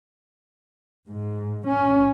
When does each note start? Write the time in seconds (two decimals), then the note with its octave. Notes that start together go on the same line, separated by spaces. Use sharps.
1.08 G#2
1.67 C#4